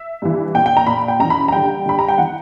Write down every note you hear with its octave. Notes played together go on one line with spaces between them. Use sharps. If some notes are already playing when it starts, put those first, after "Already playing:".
Already playing: E5
G2 E3
A#2 G5
G5
A#5
A#2 B5
G5
F#2 E3 A#5
B5
A#5
G2 D3 G5
G2 D3 B5
A#5
G5
E3 F#5